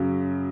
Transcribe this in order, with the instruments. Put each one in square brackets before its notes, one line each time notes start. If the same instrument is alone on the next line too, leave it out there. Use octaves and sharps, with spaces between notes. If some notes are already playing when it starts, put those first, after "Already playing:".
Already playing: [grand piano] F#2 C#3 F#3